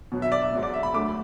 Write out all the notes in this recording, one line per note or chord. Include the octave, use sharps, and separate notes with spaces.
B2 F#3 B3
E5
D5
E5
G#2 F#3 B3
D5
E5
B5
D2 D3 F#3 A3 D6